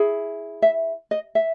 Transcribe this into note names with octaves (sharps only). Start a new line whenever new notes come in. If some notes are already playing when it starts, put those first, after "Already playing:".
Already playing: E4 G#4
E5
D#5
E5